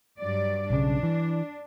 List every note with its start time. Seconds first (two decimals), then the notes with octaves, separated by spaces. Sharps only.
0.18 G2 F#3 D5
0.70 B1 C#3 D4
1.03 E3